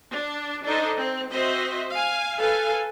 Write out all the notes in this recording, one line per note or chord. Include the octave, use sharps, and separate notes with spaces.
D4
D4 D#4 A4 C5 D#5
C4
C4 F#4 C5 D#5 E5
F5 G#5
A4 B4 F5 G#5